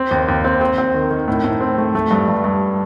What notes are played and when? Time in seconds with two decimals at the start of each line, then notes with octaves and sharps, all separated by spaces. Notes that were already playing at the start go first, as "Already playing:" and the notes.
Already playing: C4
0.11 D#2
0.28 D#2
0.44 C4
0.61 C4
0.78 C4
0.94 D#3
1.10 D#3
1.28 A2
1.45 A2
1.60 C4
1.78 A3
1.95 A3
2.11 G2
2.28 G2
2.44 G2